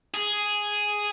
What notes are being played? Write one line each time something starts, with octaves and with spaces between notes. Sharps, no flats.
G#4